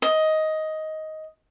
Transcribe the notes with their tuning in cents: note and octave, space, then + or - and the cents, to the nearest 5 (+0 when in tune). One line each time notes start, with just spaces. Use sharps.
D#5 +10